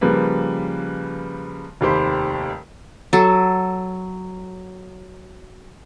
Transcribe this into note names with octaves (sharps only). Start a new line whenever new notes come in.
C#3 F3 G3 A#3 B4
F1 D#2 G4 C5 B5
F#3 A4